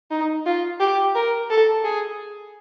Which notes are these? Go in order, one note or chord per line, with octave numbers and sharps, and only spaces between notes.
D#4
F4
G4
A#4
A4
G#4